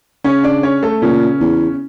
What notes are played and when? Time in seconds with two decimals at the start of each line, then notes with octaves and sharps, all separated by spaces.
0.24 C#3 C#4 C#5
0.43 D4 D5
0.63 C#4 C#5
0.83 A3 A4
1.02 A#2 C#3 C#4
1.40 E2